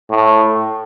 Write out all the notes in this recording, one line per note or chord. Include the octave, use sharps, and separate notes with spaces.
A2